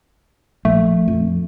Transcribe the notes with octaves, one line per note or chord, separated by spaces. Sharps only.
A#1 A3
F2